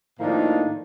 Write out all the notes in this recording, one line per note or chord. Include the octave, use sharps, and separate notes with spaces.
A2 D#3 F3 A#3 D4 D#4